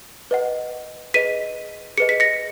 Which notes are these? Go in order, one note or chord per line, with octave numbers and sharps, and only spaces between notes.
B4 D#5 F#5
G#4 B4 D#5 B6 D#7
G#4 B4 D#5 C#7
B6
A#6 C#7